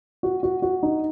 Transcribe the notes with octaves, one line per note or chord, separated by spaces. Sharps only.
F#4
F#4
F#4
D#4